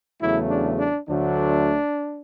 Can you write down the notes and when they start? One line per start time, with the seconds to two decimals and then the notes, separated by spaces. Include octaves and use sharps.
0.21 E2 C#3 F#3 A3 E4
0.50 D4
0.79 D4
1.08 D2 D3 F#3 A3 D4